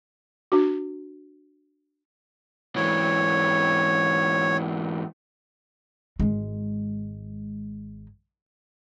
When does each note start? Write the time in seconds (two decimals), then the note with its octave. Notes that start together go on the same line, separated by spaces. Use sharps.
0.52 D4 F#4
2.76 G#2 E3 C#5
6.19 G#1 G#3